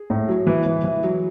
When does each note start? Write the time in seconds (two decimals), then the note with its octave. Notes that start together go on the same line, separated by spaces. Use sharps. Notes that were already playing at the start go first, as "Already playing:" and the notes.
Already playing: G#4
0.10 A2
0.28 F#3
0.47 E3
0.66 E3
0.84 E3
1.03 F#3